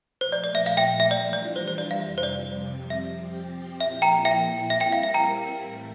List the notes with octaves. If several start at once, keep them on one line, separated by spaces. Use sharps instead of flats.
A#2 F3 A3 C5
D5
D5
E5
F5
E5 G5
E5
E3 G3 D4 F4 D5
D5
C5
C5
D5
F5
F2 C3 G3 E5
C5
D5
F3 C4 G4 E5
A#2 F3 A#3 E4 E5
G5 A#5
E5 G5
G3 C4 E4 A#4 E5
E5 G5
F5
E5
G5 A#5
A2 E3 A3